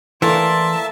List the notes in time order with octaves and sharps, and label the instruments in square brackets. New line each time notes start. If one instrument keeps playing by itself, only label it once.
[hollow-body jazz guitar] E3 [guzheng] A3 A#3 F5 [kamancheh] D5 C6 [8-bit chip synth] E5 A5